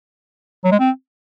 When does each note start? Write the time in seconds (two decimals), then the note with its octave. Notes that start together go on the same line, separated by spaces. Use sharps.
0.64 F#3
0.72 G#3
0.79 C4